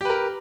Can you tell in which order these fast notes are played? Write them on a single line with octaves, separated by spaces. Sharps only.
G4 B4 A#4